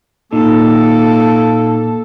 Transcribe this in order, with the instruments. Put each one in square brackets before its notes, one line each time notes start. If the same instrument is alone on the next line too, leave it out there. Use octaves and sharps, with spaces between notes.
[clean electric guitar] A#2 [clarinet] A#3 [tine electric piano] D#4 [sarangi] A4